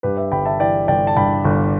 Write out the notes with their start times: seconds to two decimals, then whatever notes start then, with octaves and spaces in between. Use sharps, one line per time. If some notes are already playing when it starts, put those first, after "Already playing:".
0.03 G2 G4 B4
0.17 B4 E5
0.32 G1 G5 B5
0.45 E5 A5
0.60 E3 D5 G5
0.88 G1 D5 G5
1.07 A5
1.17 G2 G5 B5
1.45 G1